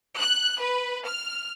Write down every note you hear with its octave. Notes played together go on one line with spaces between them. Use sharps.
F#6
B4
F6